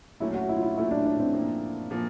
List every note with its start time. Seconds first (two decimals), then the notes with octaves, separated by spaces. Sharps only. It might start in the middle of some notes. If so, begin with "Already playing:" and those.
0.20 A#2 F#3 A3 C#4 E4
0.34 F#4
0.49 E4
0.57 F4
0.63 E4
0.77 A#2 F#3 A3 C#4 E4
0.91 D4
1.06 D4
1.20 C4
1.34 A#2 F3 A#3
1.91 A#2 F3 A#3